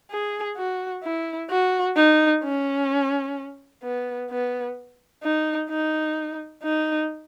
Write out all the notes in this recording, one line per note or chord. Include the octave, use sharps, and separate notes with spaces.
G#4
F#4
E4
F#4
D#4
C#4
B3
B3
D#4
D#4
D#4